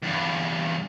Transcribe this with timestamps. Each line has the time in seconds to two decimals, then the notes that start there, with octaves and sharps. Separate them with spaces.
0.03 E2 G2